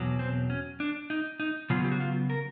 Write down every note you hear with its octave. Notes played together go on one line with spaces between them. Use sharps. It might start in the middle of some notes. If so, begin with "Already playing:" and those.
Already playing: E2 B2 F#3
C4
C#4
D4
D#4
D#4
C#3 F#3 B3 F4
G4
F#4
F4
A#4